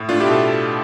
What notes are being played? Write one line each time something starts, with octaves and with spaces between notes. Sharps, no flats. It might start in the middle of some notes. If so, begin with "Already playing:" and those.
Already playing: A2
A3 D4 F4
E4 G4
B2
A4